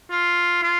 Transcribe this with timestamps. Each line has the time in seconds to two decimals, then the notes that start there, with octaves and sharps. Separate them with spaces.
0.10 F4
0.63 F4